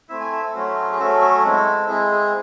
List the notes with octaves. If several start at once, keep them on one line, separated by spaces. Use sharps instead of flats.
A3 C4 E4 E5
G#5
E5
A4
F#3 A3 C#4 F#4 C5
G#4
F#3 A3 C#4 F#4 A4
A4
G#3 C4 E4
G#3 C4 E4 G#4
G#4